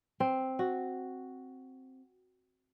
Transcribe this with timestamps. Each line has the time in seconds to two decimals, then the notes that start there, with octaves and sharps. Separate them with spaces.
0.20 C4
0.59 F#4